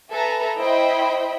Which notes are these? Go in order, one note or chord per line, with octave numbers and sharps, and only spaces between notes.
A4 B4 E5 G#5 A#5
E4 C5 D#5 E5 G5 B5